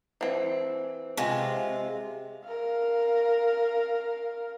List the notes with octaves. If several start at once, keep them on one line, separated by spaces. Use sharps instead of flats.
E3 C4
C3 G#3 F4
A#4 F5